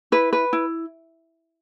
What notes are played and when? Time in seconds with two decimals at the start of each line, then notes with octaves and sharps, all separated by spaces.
0.12 E4 B4
0.33 B4
0.53 E4